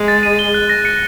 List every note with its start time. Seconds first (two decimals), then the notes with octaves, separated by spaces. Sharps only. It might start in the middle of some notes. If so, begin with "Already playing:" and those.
Already playing: G#3
0.08 A6
0.23 D#7
0.39 G7
0.54 F#6
0.69 A#6
0.85 C#7